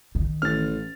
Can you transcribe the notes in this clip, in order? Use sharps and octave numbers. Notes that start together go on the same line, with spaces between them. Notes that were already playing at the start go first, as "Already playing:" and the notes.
D#3
A1 F6 A6